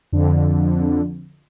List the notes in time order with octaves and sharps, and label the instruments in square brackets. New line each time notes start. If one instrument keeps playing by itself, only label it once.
[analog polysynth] F2 D3